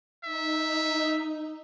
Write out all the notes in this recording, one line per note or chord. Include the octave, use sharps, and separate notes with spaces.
D#4 E5